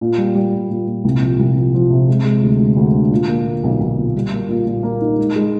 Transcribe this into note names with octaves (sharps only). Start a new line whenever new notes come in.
A#2
G3
G3
A#2
A#2
A#2
C2
F3
C2
F3
F3
C3
G#3
G#3
D2
G#3
D2
D3
A#2
A#3
A#2
B1
B1
A#2
G3
A#3
A#2
A#2
A#3
D#4
G#3
G#3